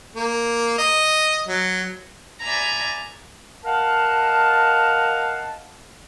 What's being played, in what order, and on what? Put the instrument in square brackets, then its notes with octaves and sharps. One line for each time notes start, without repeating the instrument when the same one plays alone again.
[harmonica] A#3
D#5
F#3
[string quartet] D5 E5 G#5 A#5 B5
[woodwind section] A#4 D#5 F5 F#5 A5